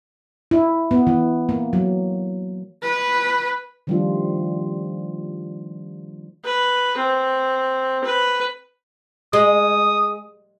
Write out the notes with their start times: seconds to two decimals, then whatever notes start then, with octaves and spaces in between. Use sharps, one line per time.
0.51 E4
0.91 B3
1.07 E3
1.49 A#3
1.73 F#3
2.82 B4
3.87 D#3 F3 G3 A3 D4 F4
6.44 B4
6.97 C4
8.04 B4
9.33 G#3 D#6